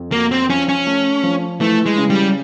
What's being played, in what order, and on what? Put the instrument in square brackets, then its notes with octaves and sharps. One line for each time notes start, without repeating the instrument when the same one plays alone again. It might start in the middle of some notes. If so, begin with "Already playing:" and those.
Already playing: [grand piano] F2
[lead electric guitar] A#3 [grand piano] F#4
[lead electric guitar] C4
[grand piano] F3 [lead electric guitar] C#4
[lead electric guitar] C#4
[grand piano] A3
F3
[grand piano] E3 [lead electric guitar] A3
[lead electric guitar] G#3
[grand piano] C#3
[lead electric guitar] G3